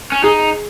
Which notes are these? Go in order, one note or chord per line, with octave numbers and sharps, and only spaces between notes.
C#4
D#4 G#4